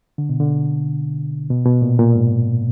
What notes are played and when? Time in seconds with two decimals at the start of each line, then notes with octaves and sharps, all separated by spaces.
0.18 D3
0.29 B2
0.40 D3
1.50 B2
1.66 B2
1.82 A#2
1.99 A#2
2.15 G#2